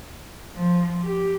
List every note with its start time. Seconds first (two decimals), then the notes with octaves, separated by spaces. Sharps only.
0.56 F3
1.02 G4